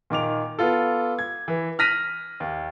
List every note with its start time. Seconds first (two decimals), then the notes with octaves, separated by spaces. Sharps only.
0.10 A#2 D#3 D6 F7
0.59 B3 F4 A4
1.19 G#6
1.48 E3
1.79 F6 F#6 A#6 B6 D#7 F7
2.40 D#2